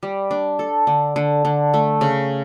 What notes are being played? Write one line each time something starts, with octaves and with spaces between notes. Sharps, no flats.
G3
D4
A4
D3
D3
D3
A3
C#3